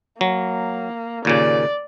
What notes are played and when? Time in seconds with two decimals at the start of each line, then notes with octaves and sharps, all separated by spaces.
0.21 F#3 A#3
1.25 D#2 A#2 C#3 D5